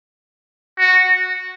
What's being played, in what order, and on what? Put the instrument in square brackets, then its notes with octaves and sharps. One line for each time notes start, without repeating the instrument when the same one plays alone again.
[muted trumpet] F#4